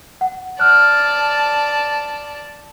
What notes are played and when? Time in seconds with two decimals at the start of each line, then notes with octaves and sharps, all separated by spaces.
0.21 F#5
0.60 D5 A5 F6 F#6